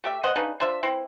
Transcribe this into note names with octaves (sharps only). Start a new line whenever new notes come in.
A3 G4 E5
B3 C5 D#5 F#5
C#3 D4 D#4 B4
D4 F4 C5 E5
E3 C4 E4